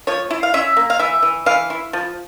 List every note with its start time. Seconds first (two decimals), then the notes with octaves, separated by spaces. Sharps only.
0.07 F3 C#5
0.31 E4
0.43 F5
0.54 C#4 E5
0.77 A#3
0.90 F5
0.99 E3 E5
1.23 E3
1.46 E3 F5
1.70 E4
1.93 F3